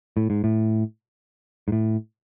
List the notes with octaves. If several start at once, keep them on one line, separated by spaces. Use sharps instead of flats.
A2
G#2
A2
G#2
A2